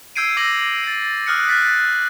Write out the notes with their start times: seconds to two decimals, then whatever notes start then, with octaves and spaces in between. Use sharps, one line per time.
0.16 E6 G6 G#6 C7 D7 D#7
0.37 D6 E6 A#6 F#7
0.84 A6 C7
1.27 D#6 F6 F#6 C#7
1.49 F6 F#6 A6 B6